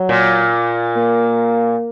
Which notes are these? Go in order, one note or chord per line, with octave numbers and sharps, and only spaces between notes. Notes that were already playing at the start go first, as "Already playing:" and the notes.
Already playing: F#3
A#2
A#3